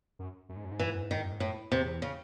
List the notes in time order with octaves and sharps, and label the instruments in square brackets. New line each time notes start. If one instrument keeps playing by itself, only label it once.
[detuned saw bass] F#2
F#2
G#2
F#2
G#2
[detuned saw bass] F#2 [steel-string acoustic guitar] E3
[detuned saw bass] G#2
F#2
G#2
[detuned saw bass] F#2 [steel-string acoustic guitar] D#3
[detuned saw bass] G#2
F#2
G#2
[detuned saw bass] F#2 [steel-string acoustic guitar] A2
[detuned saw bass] E2 [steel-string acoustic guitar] C3
[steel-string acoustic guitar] C#3